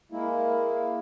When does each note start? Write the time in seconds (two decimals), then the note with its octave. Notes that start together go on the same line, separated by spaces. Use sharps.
0.12 G#3 A#3 E4